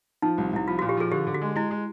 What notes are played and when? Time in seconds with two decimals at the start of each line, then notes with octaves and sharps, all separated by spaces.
0.22 F3 D#4
0.38 C2
0.53 C2 E4
0.68 F3 F4
0.79 A#2 F#4
0.89 G4
0.97 F3 G#4
1.11 D3 G4
1.27 D3
1.34 F#4
1.41 G#3
1.55 G#3 E4
1.71 G#3